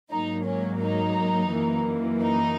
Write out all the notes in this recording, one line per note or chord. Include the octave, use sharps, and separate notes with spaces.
G#2 F#3 A#3 D#4
C#4
D#4
F#2 E3 A#3
D#4